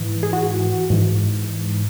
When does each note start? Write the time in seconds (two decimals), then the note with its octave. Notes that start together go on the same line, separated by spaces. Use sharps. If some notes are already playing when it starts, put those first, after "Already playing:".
Already playing: G#2 E3
0.23 G#4
0.33 F#4
0.90 G#2 E3